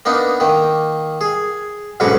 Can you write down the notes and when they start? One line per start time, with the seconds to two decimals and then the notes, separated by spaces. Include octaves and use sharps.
0.05 A#3 B3 D4 D#4
0.40 D#3 A#3
1.21 G#4
2.00 B1 G#2 D3 C#4 F#4 B4